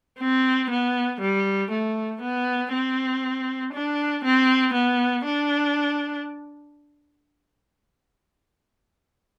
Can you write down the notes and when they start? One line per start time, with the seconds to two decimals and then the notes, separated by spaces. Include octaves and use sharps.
0.19 C4
0.70 B3
1.21 G3
1.70 A3
2.22 B3
2.72 C4
3.73 D4
4.24 C4
4.74 B3
5.24 D4